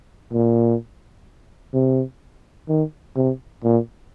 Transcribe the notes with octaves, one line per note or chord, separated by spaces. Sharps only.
A#2
C3
D#3
C3
A#2